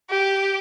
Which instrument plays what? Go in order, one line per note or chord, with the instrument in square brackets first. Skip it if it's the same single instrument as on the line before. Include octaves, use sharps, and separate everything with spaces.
[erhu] G4